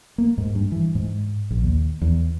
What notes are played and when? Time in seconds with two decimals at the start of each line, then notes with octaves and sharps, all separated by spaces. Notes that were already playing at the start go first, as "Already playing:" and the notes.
0.18 A#3
0.38 G#2
0.55 G2
0.72 E3
0.95 G#2
1.51 A#1
1.63 D#2
2.01 E2